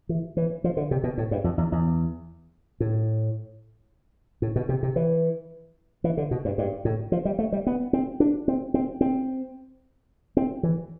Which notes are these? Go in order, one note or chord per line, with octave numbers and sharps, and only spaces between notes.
E3
E3
F3
D3
C3
B2
A2
G2
F2
E2
E2
A2
A2
B2
C3
C3
E3
E3
D3
B2
G2
G2
A2
F3
G3
A3
G3
B3
C4
D4
C4
C4
C4
C4
E3